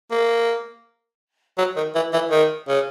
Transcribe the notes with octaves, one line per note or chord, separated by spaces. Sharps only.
A#3
F#3
D#3
E3
E3
D#3
C#3